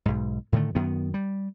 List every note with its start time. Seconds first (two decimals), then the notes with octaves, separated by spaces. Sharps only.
0.06 B1 G#2
0.52 A2 D3 D#3 A3
0.75 F#2 D#3 B3
1.14 G3